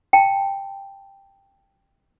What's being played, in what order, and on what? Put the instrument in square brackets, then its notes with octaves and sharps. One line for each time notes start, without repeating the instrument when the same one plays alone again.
[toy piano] G5 A5